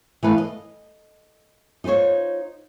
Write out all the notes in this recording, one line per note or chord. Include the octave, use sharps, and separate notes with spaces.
E3 A3 B4 F5
D#5
D#4 F4 G4 C5 C#5